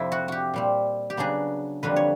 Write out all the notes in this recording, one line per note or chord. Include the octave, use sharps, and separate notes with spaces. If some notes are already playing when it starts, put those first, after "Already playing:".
Already playing: F2 C3 F3 E4
F#4
F#4 G4
A#2 G3 C4
G4
C#3 F#3 B3 D4 G#4
F2 D3 G3 A#3 B4
C#5